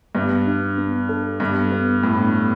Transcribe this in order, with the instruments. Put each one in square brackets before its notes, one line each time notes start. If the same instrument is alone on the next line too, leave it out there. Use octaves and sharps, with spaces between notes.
[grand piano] G2 [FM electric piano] B3
[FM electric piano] D4
B3
A4
[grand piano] G2 [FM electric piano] B3
[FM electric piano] B3
[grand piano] A2 [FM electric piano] B3
[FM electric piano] B3